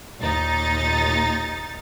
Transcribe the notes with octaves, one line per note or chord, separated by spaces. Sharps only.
D#2 A#2 D#4 A6